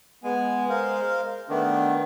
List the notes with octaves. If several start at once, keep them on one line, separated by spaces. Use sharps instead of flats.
G#3 B3 G#5
A#4 C5 F5
D#3 A3 B3 D4